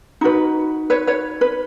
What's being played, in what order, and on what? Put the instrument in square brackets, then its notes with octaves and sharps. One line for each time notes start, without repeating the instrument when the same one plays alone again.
[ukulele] D#4 F#4 B4
B4 C#5
B4 C#5
B4